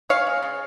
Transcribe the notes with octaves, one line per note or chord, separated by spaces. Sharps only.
G#3 C#5 F5
G#3
C#3